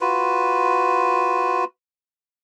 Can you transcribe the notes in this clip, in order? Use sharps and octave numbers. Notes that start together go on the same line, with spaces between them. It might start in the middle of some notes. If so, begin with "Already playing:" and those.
F4 F#4 B4